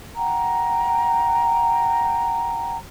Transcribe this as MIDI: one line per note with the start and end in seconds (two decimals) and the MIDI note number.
0.16 2.77 78
0.16 2.77 79
0.16 2.77 82